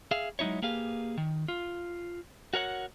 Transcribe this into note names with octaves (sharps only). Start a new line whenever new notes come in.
G#4 E5 F5
F#3 G#3 D#4 E4 C#5
A#3 G4 G#4 B4 F5
D#3
F4
F#4 A#4 C#5 F#5